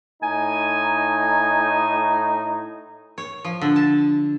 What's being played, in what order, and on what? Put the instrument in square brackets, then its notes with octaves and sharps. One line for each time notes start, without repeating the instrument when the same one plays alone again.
[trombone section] A2 D#4 [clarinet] G#5
[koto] C#5
F3
D3
A5